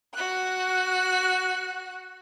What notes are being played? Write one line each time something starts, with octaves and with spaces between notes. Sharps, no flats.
F#4 F#6